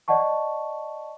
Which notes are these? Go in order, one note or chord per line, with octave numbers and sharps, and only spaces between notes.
D5 D#5 F#5 A5 C#6